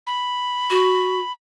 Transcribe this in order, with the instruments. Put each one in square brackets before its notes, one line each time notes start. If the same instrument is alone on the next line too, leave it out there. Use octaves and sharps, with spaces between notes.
[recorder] B5
[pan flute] F#4